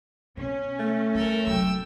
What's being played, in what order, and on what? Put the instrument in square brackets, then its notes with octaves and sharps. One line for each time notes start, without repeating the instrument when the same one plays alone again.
[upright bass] B2 [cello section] C#4
[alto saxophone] A3
[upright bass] G3 [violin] A4 A#4
[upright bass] E1 F#3 [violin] G5 E6